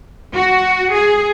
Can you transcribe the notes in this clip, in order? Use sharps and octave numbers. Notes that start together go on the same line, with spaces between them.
F#4
G#4